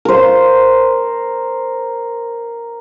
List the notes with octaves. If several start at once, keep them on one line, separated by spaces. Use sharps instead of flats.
A#4 C5